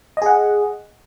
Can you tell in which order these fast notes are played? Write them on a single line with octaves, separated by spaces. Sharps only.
D#5 G#4 F#5